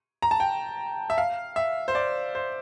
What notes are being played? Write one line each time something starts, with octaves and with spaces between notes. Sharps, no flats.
A#5
A5
G5
E5
F5
E5
C5
D5
C5